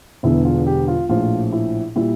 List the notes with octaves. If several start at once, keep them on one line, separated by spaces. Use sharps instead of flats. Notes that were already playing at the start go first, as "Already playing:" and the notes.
E1 E2 D3 E4
F4
G4
F4
A#1 A2 F3 F4
E4
A#2 G3 E4